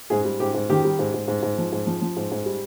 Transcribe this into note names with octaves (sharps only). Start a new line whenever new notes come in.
G#2 G#4
G3
G#2 G4
G#2
D#3 G4
G3
G#2
G#2
G#2
G#2
F3
G#2
F3
F3
G#2
G#2
G3